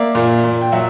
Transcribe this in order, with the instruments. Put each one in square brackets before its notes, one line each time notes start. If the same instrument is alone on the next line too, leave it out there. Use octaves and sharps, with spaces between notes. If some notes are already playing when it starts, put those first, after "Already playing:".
Already playing: [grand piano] A#3 D5 E5
A#2
A#2
G5
F#3 E5 F#5